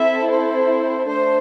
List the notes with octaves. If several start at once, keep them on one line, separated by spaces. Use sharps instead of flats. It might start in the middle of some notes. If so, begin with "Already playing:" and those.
Already playing: C4 E4 A4 E5
C5
A3 D4 C5